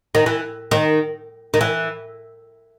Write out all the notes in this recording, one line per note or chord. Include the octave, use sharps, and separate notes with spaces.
D#3
E3
D#3
D#3
E3